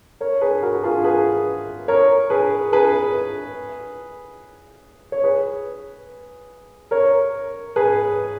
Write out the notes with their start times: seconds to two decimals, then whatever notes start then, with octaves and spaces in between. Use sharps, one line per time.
0.20 A#4 C#5
0.41 G#4 B4
0.62 F#4 A#4
0.83 F4 G#4
1.04 G#4 B4
1.88 A#4 C#5
2.30 G#4 B4
2.73 G#4 B4
5.12 C#5
5.24 G#4 B4
6.91 A#4 C#5
7.76 G#4 B4